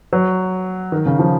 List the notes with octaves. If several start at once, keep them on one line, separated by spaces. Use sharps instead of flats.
F#3
D#3
C#3
F3